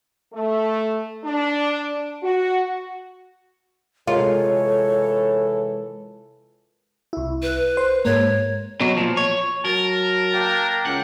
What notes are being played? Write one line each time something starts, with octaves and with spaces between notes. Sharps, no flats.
A3
D4
F#4
C3 E3 G#3 F4 A4 A#4 C#5
C2 E4
B4
C5
G#2 A#3 C#5
B2 F#3
A#2 F3
C#5
F#3 A#4 A5
A#3 D4 G5
C#2 F#5